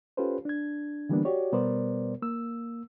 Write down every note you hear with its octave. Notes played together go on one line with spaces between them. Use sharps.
C#4 F4 G4 A4 B4 C5
D4 G#6
D3 E3 G3 A#3 B3 D4
F#4 G4 C#5 D5
B2 G3 B3 A#4 C5 D5
A#3 E6